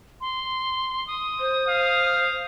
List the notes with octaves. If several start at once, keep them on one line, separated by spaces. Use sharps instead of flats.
C6
D#6
C5
F5